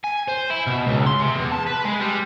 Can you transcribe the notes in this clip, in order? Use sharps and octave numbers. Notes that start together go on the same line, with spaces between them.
G#5
C5
E4
B2
C#2
C6
C3
E2
A5
B4
G#3
G3